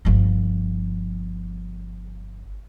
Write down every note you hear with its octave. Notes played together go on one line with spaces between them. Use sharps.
G1 F3